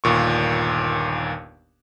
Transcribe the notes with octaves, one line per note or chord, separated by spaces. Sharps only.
G1 D#2 A#2 C#6